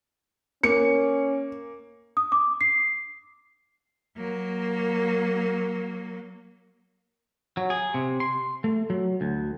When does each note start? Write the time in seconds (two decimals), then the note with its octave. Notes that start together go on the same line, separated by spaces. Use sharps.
0.63 A#3 C#4 C#7
2.17 D#6
2.32 D6
2.61 C7
4.17 F#3 A#3
7.57 F#3
7.70 G#4
7.94 C3
8.20 C6
8.64 A3
8.90 F#3
9.21 D2